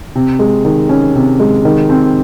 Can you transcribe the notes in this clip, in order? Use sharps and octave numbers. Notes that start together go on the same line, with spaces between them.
C3
G#3
D#3
C#4
C3
G#3
D#3
C4